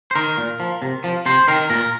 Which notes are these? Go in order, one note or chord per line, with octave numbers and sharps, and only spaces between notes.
C5
D#3 A#4
A#2
F3
C3
F3
C3 C5
D#3 A#4
A#2 A#4